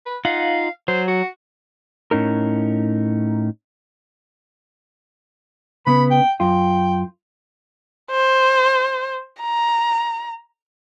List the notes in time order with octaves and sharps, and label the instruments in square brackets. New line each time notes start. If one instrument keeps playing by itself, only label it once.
[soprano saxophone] B4
[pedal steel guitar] D#4 F4 F#5 [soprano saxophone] F5
[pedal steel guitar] F#3 [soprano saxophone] C5
[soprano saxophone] F#4
[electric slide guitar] A2 C#4 D#4 A#4
[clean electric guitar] C#3 B3 [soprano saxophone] B5
[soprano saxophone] G5
[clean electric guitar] F#2 F4 [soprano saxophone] G5
[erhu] C5
A#5